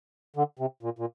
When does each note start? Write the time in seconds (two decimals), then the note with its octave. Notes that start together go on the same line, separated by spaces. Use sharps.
0.36 D3
0.59 C3
0.83 A#2
0.99 A#2